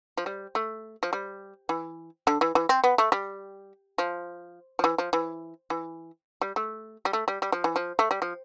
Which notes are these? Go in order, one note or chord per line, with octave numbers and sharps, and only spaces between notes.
F3
G3
A3
F3
G3
E3
D3
E3
E3
C4
B3
A3
G3
F3
F3
E3
F3
E3
E3
G3
A3
G3
A3
G3
G3
F3
E3
F3
A3
G3
F3